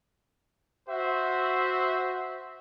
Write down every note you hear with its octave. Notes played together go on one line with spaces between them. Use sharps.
F#4 C5 E5